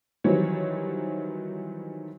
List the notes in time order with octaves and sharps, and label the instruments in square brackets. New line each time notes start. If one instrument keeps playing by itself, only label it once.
[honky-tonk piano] D#3 E3 F#3 G3 C4 C#5